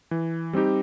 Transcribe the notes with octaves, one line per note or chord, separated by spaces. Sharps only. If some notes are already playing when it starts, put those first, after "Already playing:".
E3
G3 C4 D#4 G4